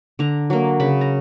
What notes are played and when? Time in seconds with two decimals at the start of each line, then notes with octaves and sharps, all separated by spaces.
0.19 D3 A#5
0.50 F#3 A#3
0.80 C#3 B5
1.01 A#5